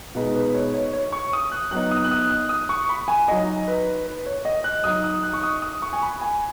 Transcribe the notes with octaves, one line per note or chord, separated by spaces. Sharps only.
B2 G#3 D#4 B4
B4
C#5
C#5
C#5
C#6
D#6
F#6
F#3 B3 D#4 F#6
D#6
F#6
D#6
F#6
D#6
C#6
B5
G#5
F#3 D#4 D#5
B4
B4
C#5
D#5
F#6
F#3 D#4 D#6
D#6
F#6
C#6
D#6
D#6
C#6
G#5
B5
G#5